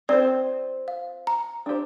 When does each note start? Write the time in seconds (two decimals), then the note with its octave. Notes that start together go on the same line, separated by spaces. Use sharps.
0.09 C4 F4 C5 D5
0.88 F5
1.27 A#5
1.66 D4 G4 C5